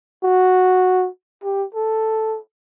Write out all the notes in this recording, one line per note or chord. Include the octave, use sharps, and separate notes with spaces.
F#4
G4
A4